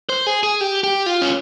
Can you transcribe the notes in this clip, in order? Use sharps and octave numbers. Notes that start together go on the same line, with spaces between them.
C5
G#4
G#4
G4
G4
F4
C#4